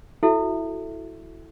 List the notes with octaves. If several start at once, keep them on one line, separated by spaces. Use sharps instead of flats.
E4 F#4 A4 E5